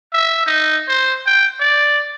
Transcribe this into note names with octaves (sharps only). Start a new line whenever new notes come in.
E5
D#4
C5
G5
D5